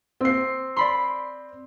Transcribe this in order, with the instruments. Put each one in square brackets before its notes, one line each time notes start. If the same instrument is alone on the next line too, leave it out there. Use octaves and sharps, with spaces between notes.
[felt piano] C4 C7
[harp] D5 B5 C6